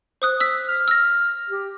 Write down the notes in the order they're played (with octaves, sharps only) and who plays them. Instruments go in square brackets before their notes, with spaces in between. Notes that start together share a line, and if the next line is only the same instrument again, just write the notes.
[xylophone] C5 D#6 F#6
E6 B6
[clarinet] F6
[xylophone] E6 A#6
[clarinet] G4